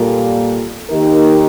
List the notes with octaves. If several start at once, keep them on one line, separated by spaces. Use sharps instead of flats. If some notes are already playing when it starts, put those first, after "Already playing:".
Already playing: A#2 G3 A#3 F4 A4
D#3 A#3 D#4 G4 A#4